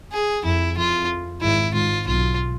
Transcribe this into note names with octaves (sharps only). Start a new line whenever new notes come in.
G#4
F2 E4
F2 F4
G#1 G#2 E4
G#1 G#2 F4
B1 B2 F4